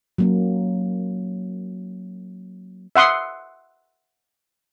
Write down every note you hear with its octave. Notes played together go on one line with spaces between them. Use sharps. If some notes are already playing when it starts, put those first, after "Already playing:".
F#3 A#3 C#4
E5 F#5 C6 D#6